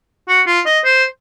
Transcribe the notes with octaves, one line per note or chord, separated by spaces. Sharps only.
F#4
F4
D#5
C5